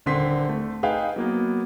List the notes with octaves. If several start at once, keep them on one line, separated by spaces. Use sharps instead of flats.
D#1 D3 C4 C6 B6
A3
D#4 G#4 B4 F5 G5
F#3 A#3 B3